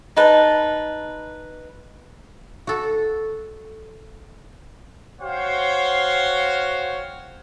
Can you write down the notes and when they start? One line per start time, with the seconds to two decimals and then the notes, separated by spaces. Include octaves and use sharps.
0.17 D#4 B4 A5
2.67 F#4 A4
5.21 F#4 C5 C#5 F5 G5